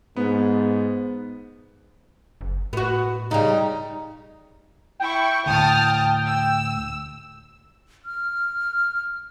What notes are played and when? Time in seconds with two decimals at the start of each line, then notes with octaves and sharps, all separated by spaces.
0.16 G#2 B3
2.41 F#1
2.73 A2 B3 F#4
3.31 C#3 G3 D#4
5.00 E4 G5 C#6
5.46 D2 A2 A5 D#6 F6
6.27 E6
8.05 F6